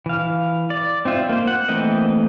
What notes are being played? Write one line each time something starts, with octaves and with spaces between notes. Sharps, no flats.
E3 F5
D5
C4 D#4 F4 E5
A#3 C5
F#5
E3 A3 A#3 C4 D#5